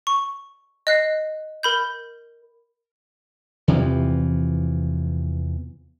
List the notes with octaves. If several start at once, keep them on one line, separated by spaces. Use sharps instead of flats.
C#6
D#5 F#6 C7
A#4 B5 G6
E2 C3 E3 F3